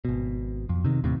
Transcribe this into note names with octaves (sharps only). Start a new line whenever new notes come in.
G#1 B2
F2
C3 D#3
D#2 A2 C3